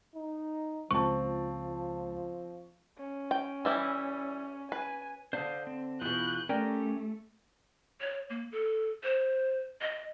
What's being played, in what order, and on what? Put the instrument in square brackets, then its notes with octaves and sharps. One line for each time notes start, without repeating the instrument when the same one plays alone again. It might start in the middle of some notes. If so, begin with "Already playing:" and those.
[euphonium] D#4
[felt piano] C#2 A5 [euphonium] F3 [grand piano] C4 [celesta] C#6
[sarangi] C#4
[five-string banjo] G5
E3 G3 E4
[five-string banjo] B4 [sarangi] G#5
[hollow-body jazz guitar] D3 D4 [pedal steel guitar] C5 F5 D#6
[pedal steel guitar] C4
[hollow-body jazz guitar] E2 B2 [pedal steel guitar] E4 F4 [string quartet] F#6 G6
[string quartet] A3 [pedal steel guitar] C#4 G4 [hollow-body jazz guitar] A#4 D5 G5
[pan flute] C#5
A#3
A4
C5
D#5